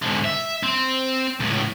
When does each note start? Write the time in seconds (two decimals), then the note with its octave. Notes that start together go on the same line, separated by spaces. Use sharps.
0.04 G#2 D3
0.25 E5
0.63 C4
1.40 C#2 A2